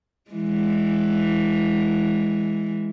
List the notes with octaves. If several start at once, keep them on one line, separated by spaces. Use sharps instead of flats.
E3 G#3